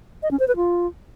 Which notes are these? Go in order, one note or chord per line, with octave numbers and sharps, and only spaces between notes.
D#5
C#4
C5
B4
F4